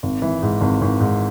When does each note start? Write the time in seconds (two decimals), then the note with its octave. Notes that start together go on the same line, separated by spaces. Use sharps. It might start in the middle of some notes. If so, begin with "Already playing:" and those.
0.03 G#1
0.22 E3
0.42 G#2
0.61 G#1
0.81 G#1
1.00 G#2